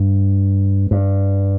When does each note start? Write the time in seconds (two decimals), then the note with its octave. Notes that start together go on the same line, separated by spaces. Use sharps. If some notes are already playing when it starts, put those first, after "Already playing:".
Already playing: G2
0.91 G2